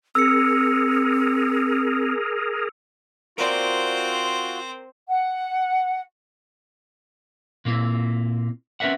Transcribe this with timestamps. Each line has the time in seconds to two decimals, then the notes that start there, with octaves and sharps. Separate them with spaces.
0.15 C4 G#4 A#4 E6 C#7
3.38 C4 F4 F#4 A#4 C5 D5
5.07 F#5
7.65 A#2 A#3 C4 E4
8.80 C4 C#4 A#4 B4 E5 F#5